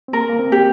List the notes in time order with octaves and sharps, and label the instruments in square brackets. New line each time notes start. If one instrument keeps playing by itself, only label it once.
[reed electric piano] C4
[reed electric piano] A#3 [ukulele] A#4
[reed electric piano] A#3
C4
[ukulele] G4